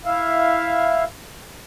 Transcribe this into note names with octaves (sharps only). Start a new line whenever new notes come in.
E4 E5 F5